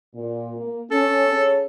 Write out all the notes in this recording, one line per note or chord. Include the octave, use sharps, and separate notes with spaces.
A#2
A#3
C#4 A4
C#4 G#4 C#5